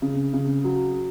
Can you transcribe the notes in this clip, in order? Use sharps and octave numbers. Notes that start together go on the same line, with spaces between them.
C#3
C#3
F#3